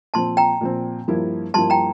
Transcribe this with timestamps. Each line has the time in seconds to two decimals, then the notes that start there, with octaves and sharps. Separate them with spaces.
0.14 A#2 F3 C4 A5 C6
0.37 G5 A#5
0.61 A#2 F3 C4
1.08 G2 F3 A#3 E4
1.54 G2 F3 A#3 E4 A5 C6
1.70 G5 A#5